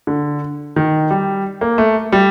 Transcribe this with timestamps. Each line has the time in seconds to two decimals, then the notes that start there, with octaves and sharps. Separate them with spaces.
0.07 D3
0.76 D#3
1.11 G3
1.61 A#3
1.78 A3
2.12 G3